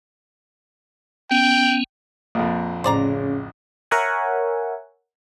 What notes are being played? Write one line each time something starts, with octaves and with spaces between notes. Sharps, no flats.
B3 C#4 G5
A#1 F2 A#3
A1 C#3 C5 D5 A#5
A#4 C#5 E5 F#5 G#5